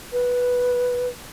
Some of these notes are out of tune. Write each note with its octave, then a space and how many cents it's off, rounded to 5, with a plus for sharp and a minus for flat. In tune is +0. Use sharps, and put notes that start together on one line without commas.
B4 -5